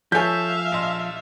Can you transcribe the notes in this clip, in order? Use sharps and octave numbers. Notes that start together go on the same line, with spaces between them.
F3 A4 C#5 E5 F5 G#5 G6 B6
A#1 D#5 C6